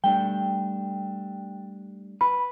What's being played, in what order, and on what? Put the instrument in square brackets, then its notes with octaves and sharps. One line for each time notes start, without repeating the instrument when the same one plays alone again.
[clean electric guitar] G3 A3 D4 [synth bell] G5
[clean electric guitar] B4 [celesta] B5